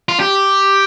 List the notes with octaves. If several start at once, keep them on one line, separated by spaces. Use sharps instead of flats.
F4
G4